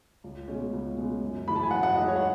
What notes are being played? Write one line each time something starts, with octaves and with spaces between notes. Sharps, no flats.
C#2
B2 G#3 C#4
C#2
B2 G#3 C#4
F#2
E3 G#3 D#4 B5
A5
G#5
F#2 F#5
F#5
E3 G#3 D#4 D#5
C#5
F#5